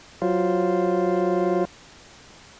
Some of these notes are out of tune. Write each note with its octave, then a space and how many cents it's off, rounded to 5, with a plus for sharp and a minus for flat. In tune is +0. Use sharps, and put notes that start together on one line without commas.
F#3 +0 F4 +0 C5 +0